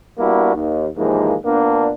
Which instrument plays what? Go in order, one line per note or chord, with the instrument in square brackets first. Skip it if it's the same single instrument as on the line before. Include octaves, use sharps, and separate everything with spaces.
[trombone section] G3 A#3 B3 D4 E4 F#4
D#2
D#2 G#2 E3 F3 G#3 A#3
A#2 A#3 B3 D4